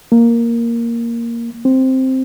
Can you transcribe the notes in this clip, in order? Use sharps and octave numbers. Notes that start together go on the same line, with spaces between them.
A#3
C4